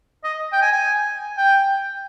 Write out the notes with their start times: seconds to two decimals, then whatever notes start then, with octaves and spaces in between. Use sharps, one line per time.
0.24 D#5
0.53 G5
0.62 G#5
0.72 G#5
1.38 G5